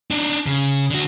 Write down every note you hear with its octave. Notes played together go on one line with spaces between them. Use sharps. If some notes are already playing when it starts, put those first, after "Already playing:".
D4 D#4
C#3
D3 F#4